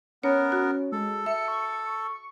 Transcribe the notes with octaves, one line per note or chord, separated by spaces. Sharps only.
B3 C#4 A#4 C#5
F#4
G#3 A4
E5 C#7
C#6